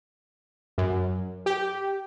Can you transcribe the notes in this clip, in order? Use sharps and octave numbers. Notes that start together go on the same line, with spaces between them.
F#2
G4